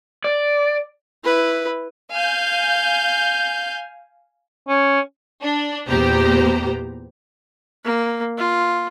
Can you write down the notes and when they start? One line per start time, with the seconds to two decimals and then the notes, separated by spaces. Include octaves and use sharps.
0.24 D5
1.24 E4 B4
2.13 F5 G#5 G6
4.68 C#4
5.43 D4
5.88 E2 A#2 B3 G4 C5 A#5
7.84 A#3
8.38 F4